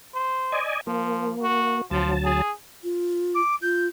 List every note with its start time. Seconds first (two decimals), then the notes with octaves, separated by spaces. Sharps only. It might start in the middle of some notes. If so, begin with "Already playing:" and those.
0.14 C5
0.52 D5 D#5 G#5
0.87 F3 A#3
1.42 F#4
1.91 D2 F3 F#3 A5
2.24 G#4
2.84 F4
3.35 D6
3.62 F4 G6